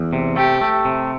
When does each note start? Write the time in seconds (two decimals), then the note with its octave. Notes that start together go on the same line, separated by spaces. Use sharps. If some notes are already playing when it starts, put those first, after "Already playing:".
Already playing: E2
0.13 C3
0.36 A3 G4
0.61 A3
0.85 C3